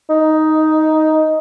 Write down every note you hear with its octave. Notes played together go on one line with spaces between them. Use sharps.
D#4